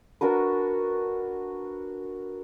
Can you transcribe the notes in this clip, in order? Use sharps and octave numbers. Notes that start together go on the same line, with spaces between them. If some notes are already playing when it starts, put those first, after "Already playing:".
D4 F#4 A#4 B4